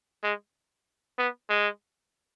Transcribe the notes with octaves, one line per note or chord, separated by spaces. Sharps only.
G#3
B3
G#3